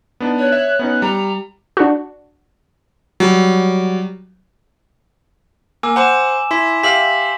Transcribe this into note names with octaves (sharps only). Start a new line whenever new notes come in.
B3 D4 D#4
C#5 F#6
E5
B3 C#4 D#4
G3 A#5
D4 F#4
F#3 G3
A#3 G#5 D6 E6
C5 F#5 A#5 D6 E7
E4 C6 B6
G4 E5 F5 B6 F#7